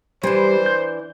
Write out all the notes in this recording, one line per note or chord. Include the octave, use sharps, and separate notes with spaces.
E3 G3 D4 C5
G6